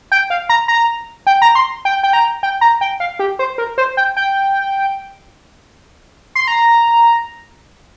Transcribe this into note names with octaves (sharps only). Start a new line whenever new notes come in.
G5
F5
A#5
A#5
G5
A#5
C6
G5
G5
A#5
G5
A#5
G5
F5
G4
C5
A#4
C5
G5
G5
C6
A#5